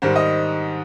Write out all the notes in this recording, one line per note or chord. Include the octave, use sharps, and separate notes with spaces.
G#2 D#3 G3 C5
D#5